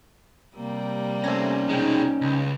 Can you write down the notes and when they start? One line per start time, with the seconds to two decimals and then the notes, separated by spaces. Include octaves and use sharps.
0.55 C3 G3 A#3
1.24 A3 C#4 C5 G#5 A#6
1.69 B2 G#3 D#4 G5
2.21 C#2